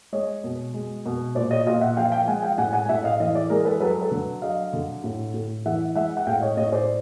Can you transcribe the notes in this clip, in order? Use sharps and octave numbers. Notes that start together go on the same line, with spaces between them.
G#3 C#5 D#5
B2
G#3
B2
A#2 C5 D5
C#5 D#5
A#2 D#5 F5
E5 F#5
F3 F5 G5
F5 G5
G#3 F#5 G#5
F5 G5
A2 F#5 G#5
F#5 G#5
A2 E5 F#5
D#5 F5
E3 D#5 F5
D5 E5
G#3 G#4 A#4
A4 B4
F#3 A4 B4
A4 B4
D3
F#3 D#5 F5
D3
A2
A2
E3 E5 F#5
G#3 E5 F#5
F#5
A2 F5 G5
C#5 D#5
A2 C#5 D#5
C5 D5